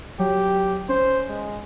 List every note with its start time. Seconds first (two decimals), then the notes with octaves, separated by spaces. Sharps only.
0.19 F#3 G4
0.89 C#4 C5
1.28 G#3